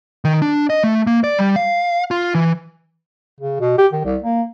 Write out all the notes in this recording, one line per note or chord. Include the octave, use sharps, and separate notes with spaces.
D#3
D4
D#5
A3
A#3
D5
G3
F5
F4
E3
C#3
B2
G4
D#3
C2
A#3